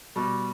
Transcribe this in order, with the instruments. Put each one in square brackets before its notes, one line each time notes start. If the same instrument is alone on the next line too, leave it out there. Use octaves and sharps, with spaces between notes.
[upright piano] B2 G3